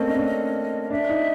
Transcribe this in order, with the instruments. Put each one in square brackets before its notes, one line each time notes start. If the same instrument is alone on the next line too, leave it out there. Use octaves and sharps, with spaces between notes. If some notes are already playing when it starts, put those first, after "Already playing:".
Already playing: [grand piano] A3 A#3 C4 C#4 [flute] D#5
[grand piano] D4
C#4
[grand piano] D4 [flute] E5
[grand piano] D#4